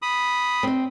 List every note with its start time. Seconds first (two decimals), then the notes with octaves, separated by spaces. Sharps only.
0.02 B5 D#6
0.63 C4 D#5